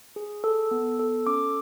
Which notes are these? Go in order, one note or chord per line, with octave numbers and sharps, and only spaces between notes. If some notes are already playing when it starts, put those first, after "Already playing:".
G#4
A4
B3
A4
C#4 D6